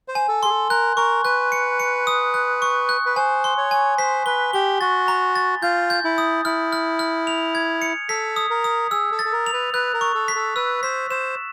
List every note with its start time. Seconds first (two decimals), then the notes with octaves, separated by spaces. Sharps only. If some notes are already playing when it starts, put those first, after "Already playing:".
0.08 C5
0.15 G#5
0.29 A4
0.43 G#4 C6
0.49 A4
0.70 A#4 F#6
0.97 A#4 C#6
1.25 B4 F#6
1.52 C#7
1.80 C#7
2.07 D#6
2.34 F#6
2.62 C#6
2.89 F#6
3.06 B4
3.16 C5 G#5
3.44 C6
3.57 C#5
3.71 G#5
3.98 C5 B6
4.26 B4 G7
4.53 G4 G7
4.81 F#4 A6
5.08 A#5
5.36 A6
5.62 F4 G6
5.90 G6
6.04 E4
6.18 D#6
6.45 E4 F6
6.72 F6
6.99 F6
7.27 F7
7.55 G#6
7.82 C#7
8.09 A4 B6
8.36 D#6
8.50 A#4
8.64 D#6
8.91 G#4 E6
9.12 A4
9.19 A6
9.25 A4
9.32 A#4
9.46 F7
9.53 B4
9.74 B4 F#6
9.93 A#4
10.01 C#6
10.15 A4
10.28 B6
10.36 A4
10.56 B4 E6
10.83 C5 B6
11.10 C5 E7